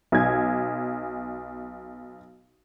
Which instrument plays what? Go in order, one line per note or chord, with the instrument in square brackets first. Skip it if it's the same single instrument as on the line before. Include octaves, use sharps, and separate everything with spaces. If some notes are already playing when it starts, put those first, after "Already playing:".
[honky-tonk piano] B1 G#5 G#6